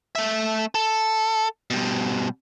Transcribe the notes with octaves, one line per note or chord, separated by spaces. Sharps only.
A3 E5
A4
B2 G3